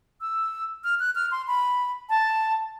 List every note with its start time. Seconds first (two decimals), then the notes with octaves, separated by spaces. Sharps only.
0.21 E6
0.84 F6
1.00 F#6
1.15 F6
1.31 C6
1.47 B5
2.10 A5